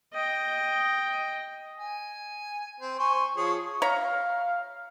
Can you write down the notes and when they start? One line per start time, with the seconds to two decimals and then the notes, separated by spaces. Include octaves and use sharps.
0.13 D#5 G5
1.78 G#5
2.80 C4
2.99 C5 G#5 C#6
3.36 F3 G#4 C#5
3.82 C#5 E5 F5 A#5